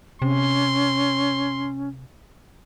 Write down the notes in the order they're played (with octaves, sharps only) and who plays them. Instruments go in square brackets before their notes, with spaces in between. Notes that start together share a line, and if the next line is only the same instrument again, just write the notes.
[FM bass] C3 [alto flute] C#4 [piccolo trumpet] C6